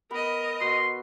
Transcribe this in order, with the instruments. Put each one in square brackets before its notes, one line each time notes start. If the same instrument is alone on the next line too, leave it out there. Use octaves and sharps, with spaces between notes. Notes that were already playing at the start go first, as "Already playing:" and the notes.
[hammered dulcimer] B3 B5 [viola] A#4 D#5
[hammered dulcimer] B2 [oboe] C6